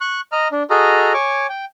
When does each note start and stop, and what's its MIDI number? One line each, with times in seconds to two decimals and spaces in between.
0.01 0.21 85
0.01 0.21 90
0.32 0.48 75
0.32 0.48 82
0.32 0.48 89
0.52 0.63 62
0.70 1.13 66
0.70 1.13 68
0.70 1.13 69
0.70 1.13 75
0.70 1.13 82
0.70 1.13 89
1.14 1.47 73
1.14 1.47 80
1.14 1.47 85
1.14 1.47 86
1.49 1.65 79